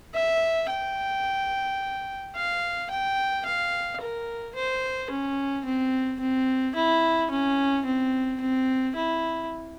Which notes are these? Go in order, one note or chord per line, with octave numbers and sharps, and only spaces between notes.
E5
G5
F5
G5
F5
A#4
C5
C#4
C4
C4
E4
C#4
C4
C4
E4